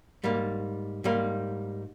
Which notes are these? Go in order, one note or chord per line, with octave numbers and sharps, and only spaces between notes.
G#2 G3 A#3
G#2 G3 A#3